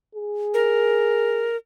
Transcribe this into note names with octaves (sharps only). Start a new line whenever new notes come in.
G#4
A#4